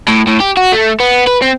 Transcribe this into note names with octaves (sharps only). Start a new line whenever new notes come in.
A2
A2
G4
F#4
A3
B3
B4
C4